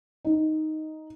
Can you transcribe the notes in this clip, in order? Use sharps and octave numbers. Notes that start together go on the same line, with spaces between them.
D#4